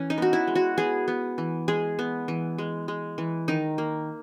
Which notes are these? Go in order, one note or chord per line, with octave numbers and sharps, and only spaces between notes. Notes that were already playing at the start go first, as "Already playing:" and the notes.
Already playing: E3 C#4
D#4
B3 F#4
E4
G#3
F#4
B3 G#4
B3
E3
G#3 G#4
B3
E3
G#3
G#3
E3
D#3 D#4
A#3